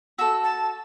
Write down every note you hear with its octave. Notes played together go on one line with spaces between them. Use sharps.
F#4 A4 E6
A5